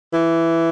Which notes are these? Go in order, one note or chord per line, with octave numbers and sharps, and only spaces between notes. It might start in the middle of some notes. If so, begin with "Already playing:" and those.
E3